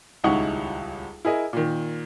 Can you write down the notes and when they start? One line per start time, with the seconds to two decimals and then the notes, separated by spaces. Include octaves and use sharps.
0.24 D#1 C#2 D#4 E4 F#5 C#6
1.25 E4 G#4 A#4 D#5
1.53 A#2 D#3